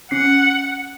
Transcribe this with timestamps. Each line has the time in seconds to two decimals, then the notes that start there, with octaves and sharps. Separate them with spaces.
0.11 C#4 F#5 C7